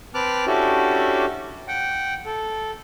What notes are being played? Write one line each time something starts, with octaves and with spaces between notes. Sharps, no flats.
C4 B4 A5 D6 F6 F#6
C#4 D4 E4 F#4 G4 A4
F#5 G5
A4